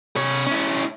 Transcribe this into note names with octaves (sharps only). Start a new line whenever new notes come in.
C3 C#5
C#4 E4